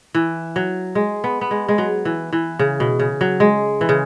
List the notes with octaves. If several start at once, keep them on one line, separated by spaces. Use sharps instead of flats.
E3
F#3
G#3
B3
B3
G#3
G#3
F#3
E3
E3
C#3
B2
C#3
F#3
G#3
E3
C#3